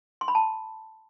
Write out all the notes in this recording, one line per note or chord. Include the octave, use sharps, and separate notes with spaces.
C6
B5
A5